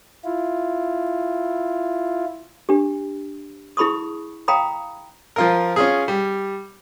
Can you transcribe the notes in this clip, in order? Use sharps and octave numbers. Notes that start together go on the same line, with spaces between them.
E4 F4
D4 G4
E4 G#4 B5 C#6 D#6
F5 G5 A#5 B5 D#6
F3 F4 A#4
C#4 F4 G#4
G3